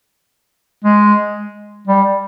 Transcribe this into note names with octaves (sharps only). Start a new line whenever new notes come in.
G#3
G3